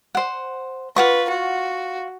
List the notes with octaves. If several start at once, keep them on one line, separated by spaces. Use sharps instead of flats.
C5 F#5
F4 B4 F#5 C#6
F#4